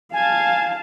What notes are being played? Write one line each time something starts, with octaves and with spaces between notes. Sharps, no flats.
F5 G#5 A5